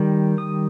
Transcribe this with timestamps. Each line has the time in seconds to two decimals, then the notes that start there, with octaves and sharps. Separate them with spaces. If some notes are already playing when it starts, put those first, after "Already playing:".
Already playing: D#3 G3
0.38 D#6